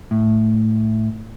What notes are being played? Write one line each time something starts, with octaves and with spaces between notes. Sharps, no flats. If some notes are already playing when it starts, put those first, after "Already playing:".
A2